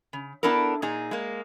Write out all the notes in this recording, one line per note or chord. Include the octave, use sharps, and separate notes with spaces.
C#3
B3 D4 E4 A4 A#4
A#2 D#4 G#4
G#3 A#3